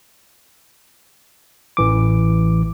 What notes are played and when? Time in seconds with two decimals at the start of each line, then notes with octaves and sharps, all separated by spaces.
1.77 A1 E3 D6